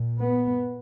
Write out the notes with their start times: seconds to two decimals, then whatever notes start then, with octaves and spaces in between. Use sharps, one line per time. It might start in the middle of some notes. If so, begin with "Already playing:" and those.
Already playing: A#2
0.20 B3